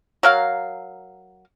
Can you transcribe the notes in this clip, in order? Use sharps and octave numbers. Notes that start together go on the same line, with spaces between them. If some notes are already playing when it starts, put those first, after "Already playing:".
F#3 A#4 F5